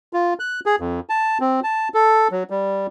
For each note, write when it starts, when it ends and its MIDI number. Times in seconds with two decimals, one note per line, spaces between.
0.13 0.34 65
0.40 0.60 90
0.66 0.76 68
0.80 1.00 41
1.09 1.38 81
1.40 1.60 60
1.64 1.88 81
1.94 2.28 69
2.31 2.43 54
2.50 2.87 55